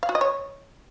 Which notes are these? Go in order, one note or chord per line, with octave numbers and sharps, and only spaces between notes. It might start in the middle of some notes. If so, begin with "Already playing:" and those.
F5
F#4
D#5
C#5